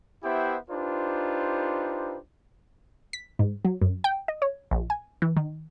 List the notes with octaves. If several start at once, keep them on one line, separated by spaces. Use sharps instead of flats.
B3 E4 G4 C5 E5 G5
D4 D#4 F4 G4 B4 C5
B6
G#2
F#3
F#2
G5
D#5
C#5
A#1
G#5
E3
D#3